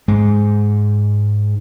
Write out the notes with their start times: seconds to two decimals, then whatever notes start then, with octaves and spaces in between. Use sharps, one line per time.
0.08 G#2 G#3